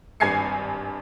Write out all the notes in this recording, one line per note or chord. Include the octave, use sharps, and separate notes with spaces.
G#1 G2 G#5 G#6 C7 C#7